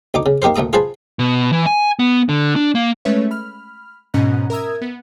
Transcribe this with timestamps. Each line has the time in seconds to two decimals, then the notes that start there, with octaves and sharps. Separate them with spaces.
0.14 D2 D#4 D6
0.26 C#3
0.42 A#3 D#4 G4 A#4 C5
0.56 D2 A#2 A3 A#5 D#6
0.73 F4 G#4 B4 C5 A5
1.19 B2
1.53 E3
1.66 G#5
1.99 B3
2.29 D3
2.56 D4
2.75 A#3
3.05 G#3 A3 C#4 B4 C#5 E5
3.31 B5 F6
4.14 G#2 B2 C#4 D#5 A#5 F#6
4.50 A#4 E5 A#5 D#6 E6 G#6
4.81 B3